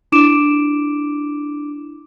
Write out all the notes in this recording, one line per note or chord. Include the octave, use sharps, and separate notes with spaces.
D4 E4 D6 D7 E7